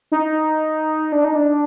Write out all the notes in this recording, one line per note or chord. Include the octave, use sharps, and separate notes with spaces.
D#4
D4
D#4
D4